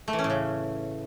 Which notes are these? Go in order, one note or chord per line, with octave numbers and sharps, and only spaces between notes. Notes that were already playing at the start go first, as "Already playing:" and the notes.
A3
E3
C#4
A2
C#3